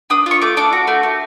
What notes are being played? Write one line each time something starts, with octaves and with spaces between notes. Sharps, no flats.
D4 D#6
F4 C#6
A3 D6
D4 D6
F#4
A3
A3